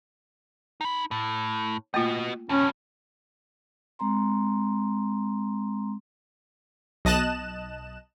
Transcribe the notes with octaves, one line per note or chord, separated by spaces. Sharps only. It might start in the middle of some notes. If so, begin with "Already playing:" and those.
D#4 B5
A2
A3 A#3 F4 F#4 D#5
F2 B2 C#4
G#3 C4 A#5 C6
B1 D#5 A5 F#6 E7